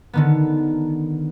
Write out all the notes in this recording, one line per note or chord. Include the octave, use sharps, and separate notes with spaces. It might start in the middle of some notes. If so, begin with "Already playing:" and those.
D3 D#3 B3